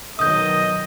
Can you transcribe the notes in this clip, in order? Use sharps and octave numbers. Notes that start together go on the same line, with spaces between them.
B2 D#3 F#3 D#5 D#6 G6